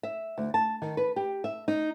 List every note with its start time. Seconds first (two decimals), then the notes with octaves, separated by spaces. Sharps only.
0.03 E5
0.38 D2
0.54 A5
0.82 D#3
0.97 B4
1.16 G4
1.44 E5
1.68 D#4